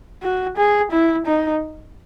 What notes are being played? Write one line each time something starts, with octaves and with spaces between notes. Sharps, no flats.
F#4
G#4
E4
D#4